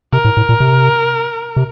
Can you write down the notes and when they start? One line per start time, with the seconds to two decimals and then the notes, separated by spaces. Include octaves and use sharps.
0.13 C3 A#4
0.25 A2
0.37 A2
0.49 A#2
0.60 C3
1.57 C3